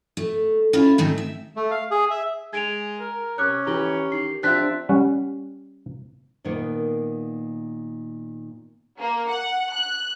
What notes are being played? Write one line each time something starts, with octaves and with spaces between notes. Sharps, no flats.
A3
C#4 E4 F4
G#2 D#3 A3 C4
E5
A3
F5
G#4
E5
G#3 G#6 D7 F7
A#4
C3 C#4 C#5 D6 F6 F#6
E3 G4 A#5
D#3 C7
C4 D4 F4 E5 F#6 A6 B6
G3 C#4 F#5
A#2 D#3 A#3 B3
A#3
F#5
F#6